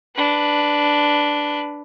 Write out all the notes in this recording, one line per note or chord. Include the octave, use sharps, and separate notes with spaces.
D4 B4